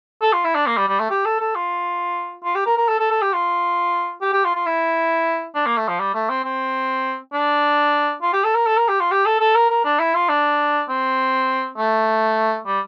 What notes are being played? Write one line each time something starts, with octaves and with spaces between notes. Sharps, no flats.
A4
F4
E4
D4
A#3
G3
G3
A3
G4
A4
A4
F4
F4
G4
A#4
A#4
A4
A4
A4
G4
F4
G4
G4
F4
F4
E4
D4
A#3
A3
F3
G3
A3
C4
C4
D4
F4
G4
A4
A#4
A4
A#4
G4
F4
G4
A4
A4
A#4
A#4
D4
E4
F4
D4
C4
A3
G3